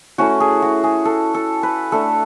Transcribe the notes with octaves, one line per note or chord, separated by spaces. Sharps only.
A3 C#4 E4 F#4
G#4
F#4
G#4
A4
A4
B4
A3 D4 A4